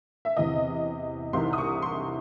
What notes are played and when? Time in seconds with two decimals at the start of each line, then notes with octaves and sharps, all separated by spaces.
0.25 E5
0.37 E2 C3 E3 D#5
1.33 C2 C3 E3 C4 D#4 C6
1.53 D#6
1.58 C#6
1.82 C6